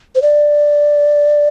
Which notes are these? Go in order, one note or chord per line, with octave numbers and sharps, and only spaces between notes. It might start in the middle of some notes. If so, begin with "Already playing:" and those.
C5
D5